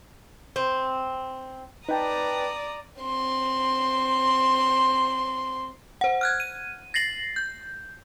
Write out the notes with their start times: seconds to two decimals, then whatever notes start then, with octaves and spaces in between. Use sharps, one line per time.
0.56 C4
1.89 D#4 B4 D5 G5 A5 A#5 D#6
3.01 C4 C6
6.01 C5 F#5
6.21 F6 F#6 G#6
6.40 D#7
6.94 A6 A#6 C7 F#7
7.36 G6